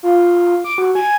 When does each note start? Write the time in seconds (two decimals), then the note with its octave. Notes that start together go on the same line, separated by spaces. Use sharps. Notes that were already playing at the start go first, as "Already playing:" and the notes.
0.03 F4
0.64 D6
0.78 F#4
0.95 G#5